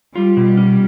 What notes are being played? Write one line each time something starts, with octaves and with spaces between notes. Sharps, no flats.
G3 F4
B2
C#4